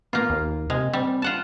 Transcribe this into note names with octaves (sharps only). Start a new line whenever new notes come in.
A#3 B3 F4
D#2
C3 G#3
G3 C4
F4 F#5 A5